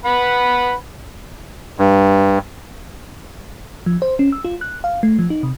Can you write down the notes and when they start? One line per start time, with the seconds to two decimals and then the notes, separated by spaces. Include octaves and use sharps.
0.05 B4 F#5 B5
1.79 G2
3.86 F3
4.02 C5
4.19 C#4
4.32 E6
4.45 F4
4.61 F#6
4.84 F5
5.03 A3
5.19 F3
5.30 D#4
5.43 C3